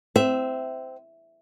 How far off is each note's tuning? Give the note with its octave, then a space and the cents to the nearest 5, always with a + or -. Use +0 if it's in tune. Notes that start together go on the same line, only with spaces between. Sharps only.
C4 -15 E5 +0